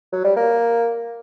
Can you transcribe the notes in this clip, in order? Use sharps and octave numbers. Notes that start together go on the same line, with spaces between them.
F#3
G3
A#3